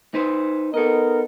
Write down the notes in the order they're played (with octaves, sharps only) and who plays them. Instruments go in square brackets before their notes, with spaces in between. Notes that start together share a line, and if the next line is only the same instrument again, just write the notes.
[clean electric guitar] D#4 B4 C5
[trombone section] B3 D#4 A#4 [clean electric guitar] A4 D#5